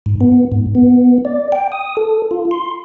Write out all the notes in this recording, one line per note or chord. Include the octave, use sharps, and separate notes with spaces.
G#2
B3
G#2
B3
D5
G5
D#6
A4
F4
C6